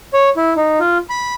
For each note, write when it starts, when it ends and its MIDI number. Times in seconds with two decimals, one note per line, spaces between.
0.14 0.30 73
0.37 0.54 64
0.57 0.79 63
0.80 0.98 65
1.10 1.34 83